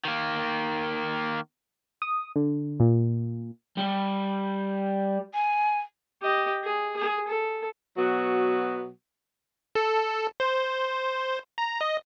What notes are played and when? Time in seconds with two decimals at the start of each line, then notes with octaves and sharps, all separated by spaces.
0.05 D#3 A#3
2.02 D#6
2.36 D3
2.80 A#2
3.78 G3
5.34 G#5
6.22 G4 D#5
6.64 G#4
6.97 G#4
7.27 A4
7.97 B2 F#3 B3 F#4
9.75 A4
10.40 C5
11.58 A#5
11.81 D#5